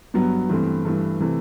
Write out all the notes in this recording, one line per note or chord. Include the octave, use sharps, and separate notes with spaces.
G2 F#3 B3
G2 E3 A3 C4
G2 E3 A3
C3 E3 A3